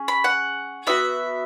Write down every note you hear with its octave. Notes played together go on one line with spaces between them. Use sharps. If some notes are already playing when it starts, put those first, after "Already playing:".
Already playing: C#4 G#4
B5
F#5
B3 F#4 E5